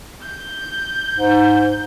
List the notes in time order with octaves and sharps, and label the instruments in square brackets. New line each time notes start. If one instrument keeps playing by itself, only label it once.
[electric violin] G6
[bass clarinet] G#2